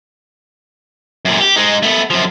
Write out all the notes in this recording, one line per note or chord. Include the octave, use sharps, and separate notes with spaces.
F#2 A#2
G4
G#3 D#4
A3 B3
F#2 F3